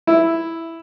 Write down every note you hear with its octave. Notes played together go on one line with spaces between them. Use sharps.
E4